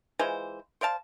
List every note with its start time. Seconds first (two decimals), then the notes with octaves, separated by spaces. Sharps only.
0.19 E3 G#3 F4 C5
0.81 C5 D5 F5 A5